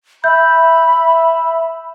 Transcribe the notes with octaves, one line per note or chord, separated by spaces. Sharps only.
E5 B5 G6